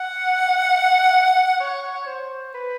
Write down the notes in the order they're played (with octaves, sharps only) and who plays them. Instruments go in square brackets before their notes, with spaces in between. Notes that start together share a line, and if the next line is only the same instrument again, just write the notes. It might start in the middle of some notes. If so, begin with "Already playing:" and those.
Already playing: [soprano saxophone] F#5
C#5
C5
B4